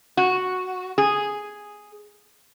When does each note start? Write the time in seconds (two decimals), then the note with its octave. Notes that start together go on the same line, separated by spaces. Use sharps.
0.17 F#4
0.98 G#4